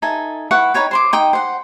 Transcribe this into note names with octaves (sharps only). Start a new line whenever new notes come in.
D#4 A4 E5 G#5
E4 B4 F#5 C#6
D#4 B4 C#5 G5
C5 C6 D6
D#4 G5 D#6
C5 F#5